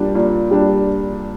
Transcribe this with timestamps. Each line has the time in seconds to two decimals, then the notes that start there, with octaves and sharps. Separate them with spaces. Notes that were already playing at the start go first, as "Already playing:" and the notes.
Already playing: A#2 G3 D4
0.15 A#2
0.51 G3 D4